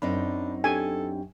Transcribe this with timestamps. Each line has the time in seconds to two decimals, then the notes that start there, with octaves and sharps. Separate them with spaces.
0.02 F#2 C4 D4 D#4 B5
0.64 D4 G4 A4 G5 G#5